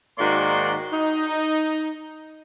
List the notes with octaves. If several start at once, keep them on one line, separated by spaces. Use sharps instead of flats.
G#2 D#3 A#3 F#4 D5 C6
D#4